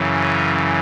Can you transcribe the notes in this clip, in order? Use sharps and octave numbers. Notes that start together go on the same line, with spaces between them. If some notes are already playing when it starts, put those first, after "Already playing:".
Already playing: F#2 C#3 E3
C#4